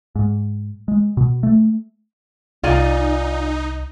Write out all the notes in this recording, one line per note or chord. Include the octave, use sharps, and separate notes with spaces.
G#2
G#3
B2
A3
C2 D#4 F4 D5 G#5